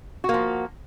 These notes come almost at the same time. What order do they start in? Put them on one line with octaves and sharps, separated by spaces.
F#4 A#3 F3